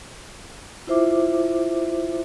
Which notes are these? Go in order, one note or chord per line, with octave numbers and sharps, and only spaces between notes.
E4 F4 C5 E5 D6